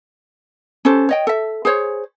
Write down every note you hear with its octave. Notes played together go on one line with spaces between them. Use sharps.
C#4 G4 A4 C5
C#5 D#5 G5
A4 E5
G#4 C5 C#5